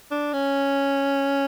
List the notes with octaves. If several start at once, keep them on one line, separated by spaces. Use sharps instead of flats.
D4
C#4